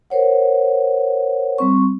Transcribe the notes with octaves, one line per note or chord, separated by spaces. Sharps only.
A#4 C5 C#5 F#5
G3 C4 C#6